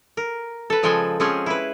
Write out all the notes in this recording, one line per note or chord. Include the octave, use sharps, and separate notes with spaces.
A#4
A4 B4
C#3 F3 G#3 A4 G5 G#5
F3 C4 C#4 G#4
E4 B4